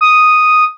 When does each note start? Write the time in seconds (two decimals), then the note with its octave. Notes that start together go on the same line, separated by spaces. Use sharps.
0.01 D#6